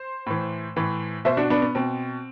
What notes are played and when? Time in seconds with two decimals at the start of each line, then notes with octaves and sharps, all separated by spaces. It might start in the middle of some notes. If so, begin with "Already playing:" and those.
Already playing: C5
0.26 A2 E3
0.76 A2 E3
1.25 B2 C5 E5
1.37 D4 F#4
1.50 B3 D4
1.62 B3
1.75 B2 C4